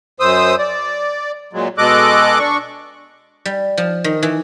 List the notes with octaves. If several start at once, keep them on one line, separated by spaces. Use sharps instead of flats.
F#2 C5 D#6 E6
D5
A#2 F#3 G#3
B2 G#3 A4 D#5 D6 F#6
D4 C#6
G3
F3
D#3
E3